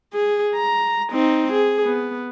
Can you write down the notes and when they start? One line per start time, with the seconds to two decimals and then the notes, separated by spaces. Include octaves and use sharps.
0.13 G#4
0.56 A#5
1.12 C4 D#4
1.53 G#4
1.84 B3